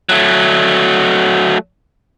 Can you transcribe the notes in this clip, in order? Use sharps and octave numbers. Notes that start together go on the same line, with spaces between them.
F#3 A3